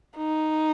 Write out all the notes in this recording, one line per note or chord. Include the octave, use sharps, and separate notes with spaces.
D#4